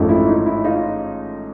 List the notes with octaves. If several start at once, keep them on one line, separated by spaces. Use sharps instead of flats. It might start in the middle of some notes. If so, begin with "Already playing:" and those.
Already playing: A1 G#2 F3 A3
E4
D#4
E4
D#4 F4